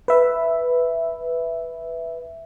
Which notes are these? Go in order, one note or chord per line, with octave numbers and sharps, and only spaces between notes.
B4 E5